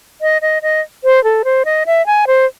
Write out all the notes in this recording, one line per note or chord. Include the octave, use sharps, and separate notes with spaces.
D#5
D#5
D#5
C5
A4
C5
D#5
E5
G#5
C5